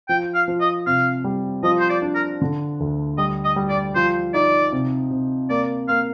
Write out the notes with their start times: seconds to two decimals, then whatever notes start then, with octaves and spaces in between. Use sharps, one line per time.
0.09 F3 G5
0.35 F5
0.48 F3
0.61 D#5
0.87 C3 F5
1.24 G3
1.63 F3 D#5
1.79 C5
1.89 D5
2.02 D4
2.15 A#4
2.41 D3
2.80 D2
3.18 G3 D#5
3.44 D#5
3.56 G3
3.69 D5
3.95 F3 C5
4.34 D#4 D5
4.72 C3
5.11 C3
5.49 A#3 D5
5.88 A#3 F5